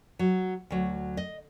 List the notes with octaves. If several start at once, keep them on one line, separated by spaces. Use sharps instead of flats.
F#3
D2 F#3
D#5